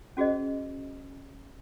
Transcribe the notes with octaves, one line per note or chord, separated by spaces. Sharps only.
C#4 F#4 G#4 C5 D#5